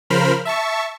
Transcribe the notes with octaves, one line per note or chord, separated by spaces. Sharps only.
C#3 F3 A#4 C5 B5 F6
E5 A5 C#6